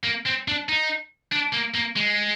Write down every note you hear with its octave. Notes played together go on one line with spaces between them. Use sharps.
A#3
C4
D4
D#4
D4
A#3
A#3
G#3